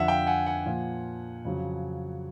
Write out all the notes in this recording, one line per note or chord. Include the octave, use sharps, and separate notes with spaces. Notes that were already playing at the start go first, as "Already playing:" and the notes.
Already playing: F2 D3 F3 E5 F#5
F5 G5
F#5 G#5
F#5 G#5
A#2 F3
F2 C#3 F#3